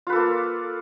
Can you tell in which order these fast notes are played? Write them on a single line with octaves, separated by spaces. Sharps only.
F4 B4 A4 A#3